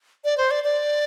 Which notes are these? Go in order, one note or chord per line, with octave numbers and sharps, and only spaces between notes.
D5
C5
D5
D5